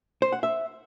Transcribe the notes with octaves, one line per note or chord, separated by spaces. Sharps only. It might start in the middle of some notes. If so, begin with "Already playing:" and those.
C5
F#5
E5